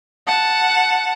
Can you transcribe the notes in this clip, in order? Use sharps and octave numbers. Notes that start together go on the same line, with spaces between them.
F#5 A5